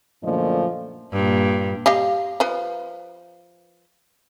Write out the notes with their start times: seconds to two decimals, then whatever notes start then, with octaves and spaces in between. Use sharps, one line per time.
0.23 F#2 A#2 D3 F3 A3 D#5
1.12 G2 A#2
1.86 G4 D#5 F5
2.40 F3 B4